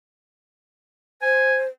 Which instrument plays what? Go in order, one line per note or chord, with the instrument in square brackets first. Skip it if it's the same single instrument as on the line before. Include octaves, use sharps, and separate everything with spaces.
[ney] C5 [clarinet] G#5